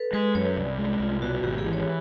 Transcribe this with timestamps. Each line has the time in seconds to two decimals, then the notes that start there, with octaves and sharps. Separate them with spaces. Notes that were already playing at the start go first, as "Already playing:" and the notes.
Already playing: A4 B4
0.13 G#3 B4
0.35 F#2 C#5
0.56 C2 D5
0.78 G#3
1.00 C2 F4
1.22 B2 F#4
1.43 G#1 G4
1.58 G#4
1.65 E3
1.73 C#5